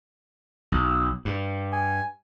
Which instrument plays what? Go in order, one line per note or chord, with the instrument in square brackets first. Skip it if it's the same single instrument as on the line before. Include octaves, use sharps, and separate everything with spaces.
[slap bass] B1
G2
[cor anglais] G#5